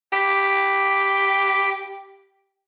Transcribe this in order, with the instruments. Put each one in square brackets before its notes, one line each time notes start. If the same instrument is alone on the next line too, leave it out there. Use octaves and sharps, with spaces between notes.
[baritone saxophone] G4 [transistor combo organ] B5 D6